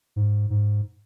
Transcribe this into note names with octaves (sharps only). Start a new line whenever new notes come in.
G#2
G#2